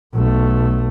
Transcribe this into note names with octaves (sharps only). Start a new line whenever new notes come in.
B1 A3